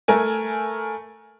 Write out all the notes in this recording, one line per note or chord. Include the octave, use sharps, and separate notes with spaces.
A3 A#4 G#5